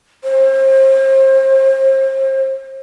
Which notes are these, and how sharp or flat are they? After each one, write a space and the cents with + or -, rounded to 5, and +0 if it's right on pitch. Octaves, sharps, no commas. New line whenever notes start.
C5 +35